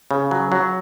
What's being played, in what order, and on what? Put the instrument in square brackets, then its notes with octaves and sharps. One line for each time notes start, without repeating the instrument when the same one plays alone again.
[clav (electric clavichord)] C#3
F#3
F#3